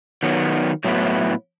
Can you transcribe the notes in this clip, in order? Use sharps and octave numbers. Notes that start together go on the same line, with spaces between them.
D#3 F#3 B3
A2 F#3 B3 E4